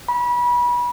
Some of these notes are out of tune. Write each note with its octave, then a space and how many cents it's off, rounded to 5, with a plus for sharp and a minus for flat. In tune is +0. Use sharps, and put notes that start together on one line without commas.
B5 -30